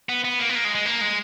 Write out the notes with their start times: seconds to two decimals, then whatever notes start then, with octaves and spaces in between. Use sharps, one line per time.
0.09 B3
0.24 B3
0.39 A#3
0.49 B3
0.55 A#3
0.65 G#3
0.75 G#3
0.86 A#3
1.01 G#3